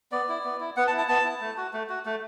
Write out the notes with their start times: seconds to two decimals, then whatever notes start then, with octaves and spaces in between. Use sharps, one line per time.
0.12 B3 D5
0.28 E4
0.44 B3
0.60 E4
0.77 B3 F#5
0.87 A5
0.93 E4
0.98 A5
1.08 B3 A5
1.25 E4
1.41 A3
1.57 F#4
1.73 A3
1.89 F#4
2.06 A3